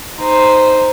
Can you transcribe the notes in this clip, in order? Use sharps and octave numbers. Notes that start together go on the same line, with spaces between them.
D#4 C5